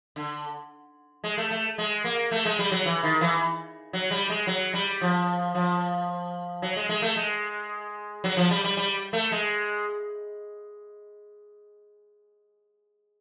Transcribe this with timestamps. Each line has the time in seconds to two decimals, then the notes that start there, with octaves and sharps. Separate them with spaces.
0.16 D3
1.24 G#3
1.38 A3
1.51 A3
1.78 G#3
2.05 A#3
2.31 A3
2.46 G#3
2.59 G3
2.72 F#3
2.85 E3
3.03 D#3
3.21 E3
3.93 F#3
4.11 G3
4.30 G#3
4.47 F#3
4.74 G3
5.01 F3
5.55 F3
6.62 F#3
6.76 G#3
6.89 G#3
7.02 A3
7.16 G#3
8.24 F#3
8.37 F3
8.51 G3
8.64 G3
8.77 G3
9.13 A3
9.32 G#3